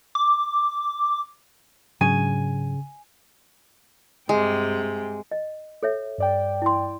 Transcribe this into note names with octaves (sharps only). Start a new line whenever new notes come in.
D6
G#2 C#3 F#3 D4 G#5
G2 C3 G#3 G5
D#5
A4 C#5 E5
G2 D5 G5
E4 C6